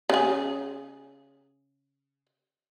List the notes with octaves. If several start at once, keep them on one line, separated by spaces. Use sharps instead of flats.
C#3 G#4